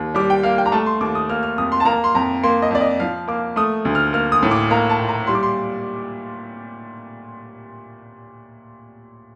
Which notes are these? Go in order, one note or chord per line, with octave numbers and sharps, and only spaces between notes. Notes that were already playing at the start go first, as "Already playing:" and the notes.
Already playing: D#2
G3 D6
G5
A#3 F5
G5
A#5
A3 A5
C6
D#2 D6
D#6
A#3 F6
F6
F2 D#6
C6
A5
A#3 A#5
C6
F2 A#5
A#3 C6
D#5
F2 D5
D#5
F3 F5
A#3 D6
A3 D#6
D2
F6
A#3 F6
D#6
A2
D6
A#3 A#5
A5
A#2
A#5
G3 C6
D6
C6